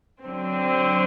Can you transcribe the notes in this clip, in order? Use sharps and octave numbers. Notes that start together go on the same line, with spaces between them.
D3 F#3 C4